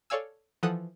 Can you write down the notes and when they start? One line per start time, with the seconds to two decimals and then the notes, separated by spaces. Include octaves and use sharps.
0.10 A4 C#5 D5 F5 G#5 E6
0.63 E3 F3 A4 F#5 D#6 F#6